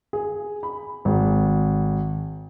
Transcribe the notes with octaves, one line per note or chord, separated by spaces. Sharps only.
G#4
B5
G#1